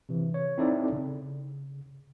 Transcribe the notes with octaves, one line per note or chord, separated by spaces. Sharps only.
C3 E3
C#5
C4 D#4 E4 A4 D5
C#3